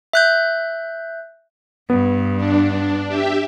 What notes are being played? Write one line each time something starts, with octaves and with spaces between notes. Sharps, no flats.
E5 F#6 G6
G2 B3
D4
G4 E5